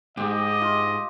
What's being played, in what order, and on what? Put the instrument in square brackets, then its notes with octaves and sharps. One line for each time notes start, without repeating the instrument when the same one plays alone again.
[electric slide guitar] G#2 [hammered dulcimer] G4 [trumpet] D#5
[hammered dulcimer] F4